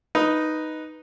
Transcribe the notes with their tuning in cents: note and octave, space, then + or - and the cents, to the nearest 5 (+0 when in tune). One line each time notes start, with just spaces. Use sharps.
D#4 +0 B4 +0